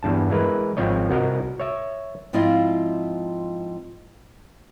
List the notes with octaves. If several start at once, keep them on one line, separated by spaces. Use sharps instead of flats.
E2 G2 A5
E3 G#3 A#4 B4
G#1 F3 C4 C#5 D#5
C2 F#4 A#4 D#5
C#5 E5
G#2 F3 C4 E4 F4 D#5